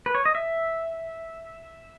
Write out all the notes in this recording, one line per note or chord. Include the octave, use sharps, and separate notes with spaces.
B4
C#5
D#5
E5